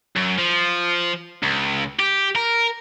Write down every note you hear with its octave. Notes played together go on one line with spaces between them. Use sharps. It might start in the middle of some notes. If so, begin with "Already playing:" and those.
F#2
F3
C#2
G4
A#4